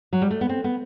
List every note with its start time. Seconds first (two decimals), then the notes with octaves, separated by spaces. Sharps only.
0.13 F#3
0.22 G3
0.31 A3
0.41 B3
0.49 C4
0.64 B3